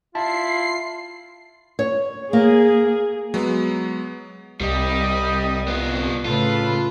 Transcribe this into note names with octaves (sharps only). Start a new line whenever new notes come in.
E4 F4 A5 C7
C#5
A#3 G#4
F#3 G#3 B3
C2 G3 D#5
B3 F4
A2 C#3 F4 A4 B4